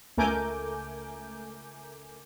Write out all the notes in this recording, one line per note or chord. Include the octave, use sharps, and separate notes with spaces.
C#2 A3 A#4 G#5 D6 G6